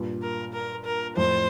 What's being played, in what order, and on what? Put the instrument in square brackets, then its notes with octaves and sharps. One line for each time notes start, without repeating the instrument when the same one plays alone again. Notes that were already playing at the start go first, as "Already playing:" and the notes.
Already playing: [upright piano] G2 A#2
[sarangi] A#4
A#4
A#4
[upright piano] F2 A2 [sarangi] C5